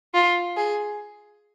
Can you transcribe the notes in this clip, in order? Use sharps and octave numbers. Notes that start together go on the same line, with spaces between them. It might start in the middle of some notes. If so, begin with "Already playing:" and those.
F4
G#4